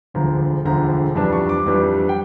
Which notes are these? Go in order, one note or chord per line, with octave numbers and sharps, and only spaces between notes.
E1 D2 D3 F3 A#5
E1 D2 D3 F3 A#5
F2 E3 G3 D4 A5
C#6
D6
F2 E3 G3 D4
G5